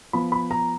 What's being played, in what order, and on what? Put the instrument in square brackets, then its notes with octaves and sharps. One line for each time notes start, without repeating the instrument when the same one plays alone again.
[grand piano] F3 B3 B5
B5
A#5